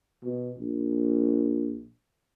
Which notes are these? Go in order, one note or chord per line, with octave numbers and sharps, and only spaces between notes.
B2
A#1